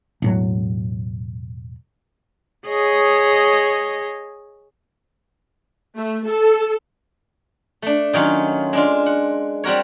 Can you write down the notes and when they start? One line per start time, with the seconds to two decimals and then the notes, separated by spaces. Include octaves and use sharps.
0.22 E1 A2 F#3
2.68 G#4 C#5 D#5
5.98 A3
6.29 A4
7.82 A3 D4
8.13 D#3 F#3 C#4 F4
8.73 G#3 D4 F4
9.06 F#5
9.64 G3 C4 F#4 A#4 C#5